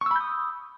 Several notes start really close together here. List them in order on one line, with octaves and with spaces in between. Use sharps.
C#6 E6 B5 G6 D#6